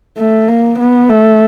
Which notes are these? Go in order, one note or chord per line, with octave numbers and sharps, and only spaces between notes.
A3
A#3
B3
A3